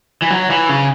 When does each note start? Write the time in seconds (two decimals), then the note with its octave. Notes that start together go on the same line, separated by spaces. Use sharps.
0.22 E3
0.30 F#3
0.50 E3
0.69 C#3